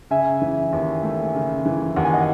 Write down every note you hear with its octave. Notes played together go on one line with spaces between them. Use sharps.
C#3 E5 G#5
E3
D#2
A3
C#3
E3
D#2 F#5
G#5
D#5 F#5